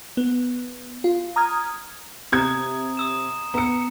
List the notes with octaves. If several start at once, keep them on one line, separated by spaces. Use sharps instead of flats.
B3
F4
A#5 D#6 F6 G#6
C3 A#5 D#6 G#6
D#6 E6 E7
B3 A#5 E6 C#7